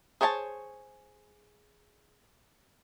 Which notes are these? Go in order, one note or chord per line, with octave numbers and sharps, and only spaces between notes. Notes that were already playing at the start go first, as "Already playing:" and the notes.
G#4 C5 C#5 G5 A5